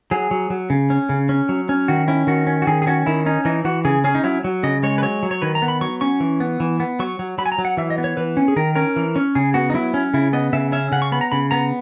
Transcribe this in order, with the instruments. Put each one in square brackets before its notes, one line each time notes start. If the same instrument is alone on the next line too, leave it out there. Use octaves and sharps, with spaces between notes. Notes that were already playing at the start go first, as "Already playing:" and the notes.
[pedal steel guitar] F#3 G#4
F#3
F#3
C#3
C#4
C#3
C#4
F#3
C#4
D#3 F#4
C#4 E4
D#3 F#4
C#4
F#4
D#3 G#4
G#4
C#4 F#4
D#3 E4
C#4 D#4
E3 D#4
E3 F#4
C#3 G#4
C#4 G#4
D#4
F#3 E4
F#3
C#3 D#5
G#3 C#5
B4
F#3 C#5
F#3
C#5
D#3 B4
A#5
B3
B5
F#3 C#6
C#4 C#6
E3
B3
E3
B3
F#3 C#6
F#3
F#3 B5
G#5
A#5
F#3
F#5
E3 E5
D#5
B3
C#5
E3 B4
C#4
G#4
D#3 A#4
C#4 A#4
E3
C#4
C#3 G#4
B3 F#4
D#4
F#3 E4
C#4
C#3 E4
B3 D#5
C#3 E5
C#4 E5
C#3 F#5
C#6
B3 B5
A#5
C#3 B5
B3 A#5